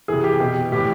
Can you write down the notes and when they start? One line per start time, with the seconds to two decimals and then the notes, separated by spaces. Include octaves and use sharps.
0.08 C3 E3 G#4
0.24 G4
0.40 B2 G4
0.72 A2 E3 G4